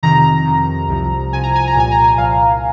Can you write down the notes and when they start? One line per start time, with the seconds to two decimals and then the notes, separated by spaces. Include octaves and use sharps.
0.03 F2 C3 D#3 A#5
0.46 F2 C3 D#3
0.89 C2 C3 F3
1.32 C2 C3 F3 G#5
1.44 A#5
1.56 G#5
1.68 A#5
1.75 C2 A#2 F3 G#5
1.91 A#5
2.04 G#5
2.18 C2 A#2 F3 F5